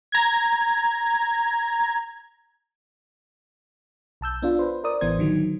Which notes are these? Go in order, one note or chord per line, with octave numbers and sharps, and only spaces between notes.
A#5 G#6
B1 A5 E6 G6
B3 D4 F4
B4 C5
A#4 C5 D5 D#6
A1 E3 B3 C5 G#6
D3 D#3 F#3